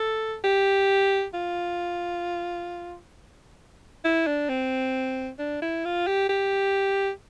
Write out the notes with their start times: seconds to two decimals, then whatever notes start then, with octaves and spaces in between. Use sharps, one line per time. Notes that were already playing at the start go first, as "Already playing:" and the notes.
Already playing: A4
0.44 G4
1.34 F4
4.04 E4
4.27 D4
4.49 C4
5.39 D4
5.62 E4
5.85 F4
6.07 G4
6.29 G4